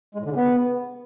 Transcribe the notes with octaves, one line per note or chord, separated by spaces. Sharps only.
G#3
A2
D3
C#3
B3